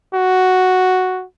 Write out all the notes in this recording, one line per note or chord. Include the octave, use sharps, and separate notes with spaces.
F#4